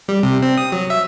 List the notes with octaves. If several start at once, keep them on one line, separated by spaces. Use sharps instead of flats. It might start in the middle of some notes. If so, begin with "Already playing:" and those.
G3
C3
C4
D#6
F#3
E5